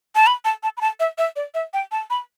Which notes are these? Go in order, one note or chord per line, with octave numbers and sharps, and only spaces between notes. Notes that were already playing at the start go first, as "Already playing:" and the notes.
A5
B5
A5
A5
B5
A5
E5
E5
D5
E5
G5
A5
B5